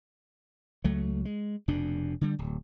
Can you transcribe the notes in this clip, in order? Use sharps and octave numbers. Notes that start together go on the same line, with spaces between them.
C#2 F#3 A3
G#3
F1 F2 B2 D4
D3 G3
D1